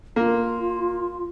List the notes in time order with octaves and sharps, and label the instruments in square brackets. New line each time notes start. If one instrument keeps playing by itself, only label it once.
[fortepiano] A#3 [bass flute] F4